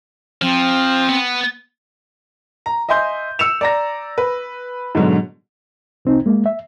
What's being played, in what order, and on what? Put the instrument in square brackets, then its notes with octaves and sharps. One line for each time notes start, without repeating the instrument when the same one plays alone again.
[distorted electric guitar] F3 [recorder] C4
[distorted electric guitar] B3
[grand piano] A#5
D#5 E5 G#5 C6 G6
E6 C#7 E7 F7
D5 A#5 A#6
B4
G#2 B2 D3 F#3
[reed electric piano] C2 C4 D#4
G#3 A#3
E5